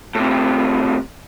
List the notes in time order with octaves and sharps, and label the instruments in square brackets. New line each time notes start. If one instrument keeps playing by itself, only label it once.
[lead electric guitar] A2 C3